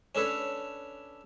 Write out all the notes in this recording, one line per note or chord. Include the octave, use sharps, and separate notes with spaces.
C#4 D4 A4 B4 C#5